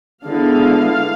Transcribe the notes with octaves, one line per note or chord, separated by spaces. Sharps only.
D3 G#3 B3 E4 F5